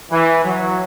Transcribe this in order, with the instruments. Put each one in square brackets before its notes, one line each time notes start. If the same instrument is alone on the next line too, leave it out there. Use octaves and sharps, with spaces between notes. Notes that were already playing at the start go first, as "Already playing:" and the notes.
[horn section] E3
F#3